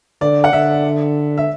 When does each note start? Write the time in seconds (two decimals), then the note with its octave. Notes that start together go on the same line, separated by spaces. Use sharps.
0.21 D3 D5
0.44 F#5
0.53 D3 E5
1.38 E5